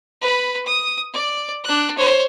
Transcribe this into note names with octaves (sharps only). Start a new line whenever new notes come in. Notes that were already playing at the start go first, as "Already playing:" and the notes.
B4 B5
D#6
D5
D4 F#6
C5 C#5